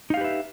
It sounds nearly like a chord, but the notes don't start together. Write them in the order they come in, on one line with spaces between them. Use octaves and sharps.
D#4 F5 G4 B4 E5